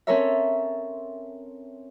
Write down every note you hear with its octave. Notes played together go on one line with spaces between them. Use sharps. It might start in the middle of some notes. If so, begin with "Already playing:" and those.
C4 C#4 A4 A#4 C#5 E5